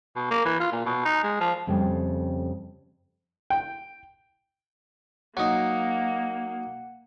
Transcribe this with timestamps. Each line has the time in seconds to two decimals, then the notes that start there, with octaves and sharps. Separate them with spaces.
0.16 B2
0.31 A#3
0.45 E3
0.60 F4
0.72 A#2
0.86 B2
1.05 D#4
1.24 G#3
1.40 F3
1.67 F2 C#3 G3 A3 G5
3.50 G5
5.37 F#3 A#3 D#4 F#5